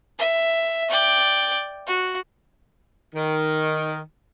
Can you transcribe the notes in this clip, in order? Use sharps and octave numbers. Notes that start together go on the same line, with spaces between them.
E5
D5 G5
F#4
D#3